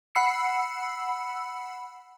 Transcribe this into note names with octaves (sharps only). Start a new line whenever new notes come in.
F#5 B5 E6 C7 C#7